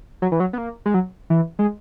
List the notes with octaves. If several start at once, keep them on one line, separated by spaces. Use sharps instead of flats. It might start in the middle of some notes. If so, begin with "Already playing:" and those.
F#3
E3
F#3
B3
A#3
G#3
F#3
E3
G#3